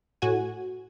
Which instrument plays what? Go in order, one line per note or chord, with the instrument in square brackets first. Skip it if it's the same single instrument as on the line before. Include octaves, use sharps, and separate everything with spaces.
[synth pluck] A2 F#4 G#5